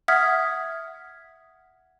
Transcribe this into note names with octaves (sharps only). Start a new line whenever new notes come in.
E5 F#5 D#6 F6 G#6 B6